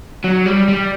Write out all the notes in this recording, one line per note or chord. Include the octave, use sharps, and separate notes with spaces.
F#3
G3
G3